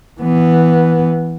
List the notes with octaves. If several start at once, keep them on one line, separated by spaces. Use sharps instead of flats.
E3 B3